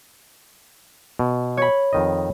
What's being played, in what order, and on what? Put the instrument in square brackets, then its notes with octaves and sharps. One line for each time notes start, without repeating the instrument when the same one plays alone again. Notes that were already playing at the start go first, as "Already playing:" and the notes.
[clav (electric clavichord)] B2
[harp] C#5 B5
[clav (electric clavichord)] F2 D#3 D#5